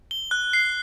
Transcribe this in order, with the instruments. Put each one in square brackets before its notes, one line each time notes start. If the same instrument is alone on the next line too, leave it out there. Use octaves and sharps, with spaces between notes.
[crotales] G7
F#6
C7